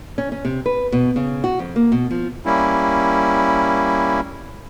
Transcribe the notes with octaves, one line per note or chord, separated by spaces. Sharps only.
C#4
C#4
C3
B4
B2
C#3
F#4
F2
A#3
B2
F3
G3 A#3 C#4 E4